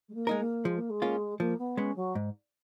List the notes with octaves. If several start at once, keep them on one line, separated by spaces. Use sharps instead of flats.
G#3
A#3
G#3 D#4 A#4
A#3
F3 G#3
A#3
G#3
A#3 C#4 F4
F3 A#3
B3
G#3 B3 C#4
F#3
G#2